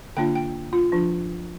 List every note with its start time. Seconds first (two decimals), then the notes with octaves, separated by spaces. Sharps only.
0.16 D3 A#3 D4 F4 G5
0.35 G5
0.73 F4
0.92 F3 D4 F4